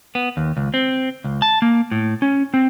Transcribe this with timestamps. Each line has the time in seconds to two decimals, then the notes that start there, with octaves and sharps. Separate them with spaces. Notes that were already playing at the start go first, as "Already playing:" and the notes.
0.15 B3
0.37 D#2
0.57 C#2
0.74 C4
1.24 C#2
1.42 A5
1.62 A#3
1.92 A2
2.22 C#4
2.54 C4